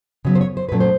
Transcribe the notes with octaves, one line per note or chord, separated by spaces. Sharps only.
C#3 F#3 B3
C5
C#5
C5
A#2 F#3 A3 C#4 B4
C5